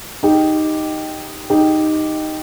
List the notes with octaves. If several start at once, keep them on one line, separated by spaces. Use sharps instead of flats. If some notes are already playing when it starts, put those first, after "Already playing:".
D#4 G4
D#4 G4